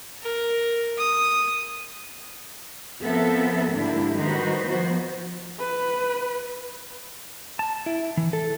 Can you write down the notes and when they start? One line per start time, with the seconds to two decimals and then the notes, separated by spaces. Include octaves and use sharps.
0.23 A#4
0.98 D#6
3.02 F3 B3 C4 A4 A#4 E5
3.73 G#2 D3 A#3 D4 E4 G4
4.14 D#3 G3 D#4 F#4 B4 C5
4.68 F3 B3 F#4 C5
5.59 B4
7.59 A5
7.86 E4
8.17 E3
8.33 A4